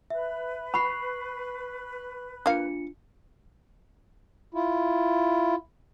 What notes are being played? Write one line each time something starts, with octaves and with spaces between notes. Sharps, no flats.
B4 E5
B5 C#6 C7
A#3 D4 F4 F5 C#7
E4 F4